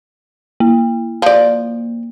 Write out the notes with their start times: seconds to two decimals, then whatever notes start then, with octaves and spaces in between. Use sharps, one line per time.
0.60 A#3
1.22 F3 D5